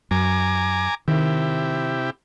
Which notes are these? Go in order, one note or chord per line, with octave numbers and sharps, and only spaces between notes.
F#2 G#5 A#5 D6
C3 D#3 E4 G4